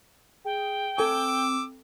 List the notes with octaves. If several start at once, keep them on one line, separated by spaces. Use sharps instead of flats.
G#4 G5
C4 A4 G#5 D6 E6